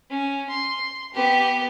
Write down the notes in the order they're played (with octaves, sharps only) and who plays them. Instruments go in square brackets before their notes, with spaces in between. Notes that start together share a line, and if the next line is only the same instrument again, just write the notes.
[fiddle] C#4
C6
B3 G4